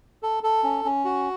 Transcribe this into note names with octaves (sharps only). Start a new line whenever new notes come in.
A4
A4
C#4
C#4
F#4